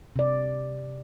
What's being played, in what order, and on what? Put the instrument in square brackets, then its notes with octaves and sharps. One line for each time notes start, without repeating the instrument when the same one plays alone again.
[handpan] C3 D5